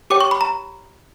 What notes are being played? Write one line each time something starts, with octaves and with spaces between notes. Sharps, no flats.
G4 C#5 G5 D6
C#6
B5
A#5